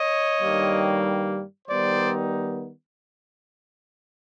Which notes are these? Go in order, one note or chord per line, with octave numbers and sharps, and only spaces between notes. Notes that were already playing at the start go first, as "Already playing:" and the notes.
Already playing: C#5 D#5
G2 D#3 G3 A#3
D#3 G3 B3 D#4 C5 D5